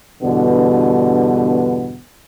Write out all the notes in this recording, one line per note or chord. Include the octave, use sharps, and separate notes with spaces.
E2 G2 B2 D3 B3